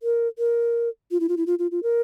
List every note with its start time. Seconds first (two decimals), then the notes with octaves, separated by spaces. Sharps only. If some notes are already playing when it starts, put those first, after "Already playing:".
0.03 A#4
0.38 A#4
1.11 F4
1.20 E4
1.29 F4
1.37 E4
1.47 F4
1.59 F4
1.71 F4
1.83 A#4